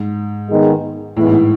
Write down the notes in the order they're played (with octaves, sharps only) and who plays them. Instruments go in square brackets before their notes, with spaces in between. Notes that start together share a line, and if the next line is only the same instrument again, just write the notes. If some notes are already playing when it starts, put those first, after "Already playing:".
Already playing: [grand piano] G#2
[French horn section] D#3 G#3 B3 D#4 G#4
[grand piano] A2 [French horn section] E3 G#3 B3 E4
[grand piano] G#2